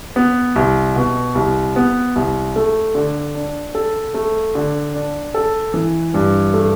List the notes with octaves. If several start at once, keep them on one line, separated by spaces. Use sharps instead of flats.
B3
C2
B2
C2
B3
C2
A3
D3
D4
A4
A3
D3
D4
A4
E3
G2
A3